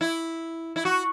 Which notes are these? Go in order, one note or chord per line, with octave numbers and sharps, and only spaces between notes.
E4
E4
F#4